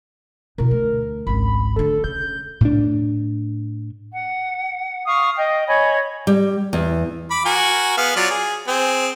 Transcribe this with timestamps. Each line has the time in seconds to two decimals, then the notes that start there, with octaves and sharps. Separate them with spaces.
0.58 B2 E4 A#4
0.71 D2
1.27 G#1 C#2 B5
1.76 D2 D3 A4
2.04 C#3 G6
2.61 A2 D4
4.13 F#5
5.06 F5 C#6 D#6
5.37 D#5 G5
5.67 C#5 D#5 G#5 B5
6.27 G3
6.73 E2
7.31 B5 D6
7.45 F#4 A#4 G#5
7.97 B3 G#4 F5
8.16 F#3 F4 D5
8.31 G#4
8.68 C4 G#4